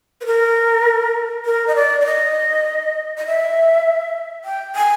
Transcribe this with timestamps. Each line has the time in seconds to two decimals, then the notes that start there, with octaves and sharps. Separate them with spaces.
0.21 B4
0.26 A#4
1.45 A#4
1.67 D#5
1.75 D5
2.01 D5
2.06 D#5
3.18 D#5
3.26 E5
4.45 G5
4.76 G#5